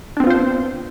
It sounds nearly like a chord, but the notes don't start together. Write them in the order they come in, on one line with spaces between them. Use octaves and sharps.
D4 C4 B3 F4 C5